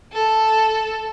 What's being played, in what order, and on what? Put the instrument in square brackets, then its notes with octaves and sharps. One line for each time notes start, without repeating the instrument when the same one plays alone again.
[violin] A4